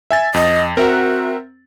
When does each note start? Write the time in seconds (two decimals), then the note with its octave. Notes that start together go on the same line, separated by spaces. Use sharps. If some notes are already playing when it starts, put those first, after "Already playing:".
0.11 E5 G#5 A6
0.34 F2 D#5
0.77 C4 F#4 A#4 E5 F#5